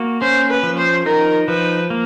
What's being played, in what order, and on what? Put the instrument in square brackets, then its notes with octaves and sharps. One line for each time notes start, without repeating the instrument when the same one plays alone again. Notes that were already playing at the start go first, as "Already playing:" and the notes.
Already playing: [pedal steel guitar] A#3 F#4
[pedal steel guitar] C#4 [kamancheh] C5
[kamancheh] B4
[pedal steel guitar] F3
[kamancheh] C5
[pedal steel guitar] D#4 [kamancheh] A#4
[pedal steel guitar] F3 [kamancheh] B4
[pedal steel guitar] A#3